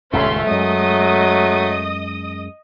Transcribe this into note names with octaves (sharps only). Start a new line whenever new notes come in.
D#1 C#2 G2 A3 C#4 E5 C6
F#2 F#3 G#3 D#5 D#6